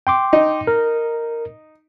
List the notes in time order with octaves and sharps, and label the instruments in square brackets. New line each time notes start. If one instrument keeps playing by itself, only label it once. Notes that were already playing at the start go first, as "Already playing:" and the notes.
[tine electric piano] G5 C6 D6
[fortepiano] D#4
[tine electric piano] A#4